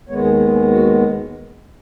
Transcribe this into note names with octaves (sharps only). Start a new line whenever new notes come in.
D#2 D#3 G#3 B3 C#5
G#4
G#4
G#4
F#4